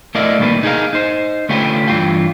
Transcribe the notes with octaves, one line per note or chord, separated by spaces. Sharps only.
A3 E4 A#4 D5 D#5 F5
C2 A2 D#3 G3 A#3 B4
D#4 G#4 A#4 F5
D#4 C5
D3 A3 C#4 F4 G4 B4
G2 D#3 E3 F4 G5